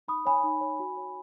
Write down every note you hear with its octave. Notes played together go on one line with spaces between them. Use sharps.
D#4 B5 D#6
C#5 G#5 B5
D#4
C#5
F#4
C#5